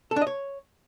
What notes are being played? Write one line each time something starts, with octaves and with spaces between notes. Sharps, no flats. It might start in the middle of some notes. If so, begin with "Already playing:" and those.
A4
D4
D#5
C#5